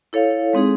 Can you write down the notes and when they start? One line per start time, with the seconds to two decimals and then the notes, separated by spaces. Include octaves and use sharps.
0.13 E4 A4 C#5 F5
0.53 G#3 C4 D#4 G#4